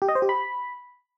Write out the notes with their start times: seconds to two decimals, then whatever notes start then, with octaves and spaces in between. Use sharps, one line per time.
0.02 G4
0.09 D#5
0.15 C5
0.22 G4
0.29 B5